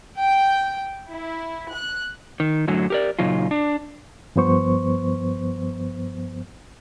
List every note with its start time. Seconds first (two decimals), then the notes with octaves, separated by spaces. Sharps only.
0.19 G5
1.11 E4
1.73 F#6
2.40 D#3
2.68 F#2 A2 D3 F#3
2.90 G4 A#4 D5
3.19 A#2 C#3 F#3 D#4 F4
3.51 D4
4.36 G2 F3 B3 C5 C#6